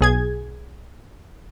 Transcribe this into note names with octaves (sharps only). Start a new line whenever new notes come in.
B1 G#4 G#6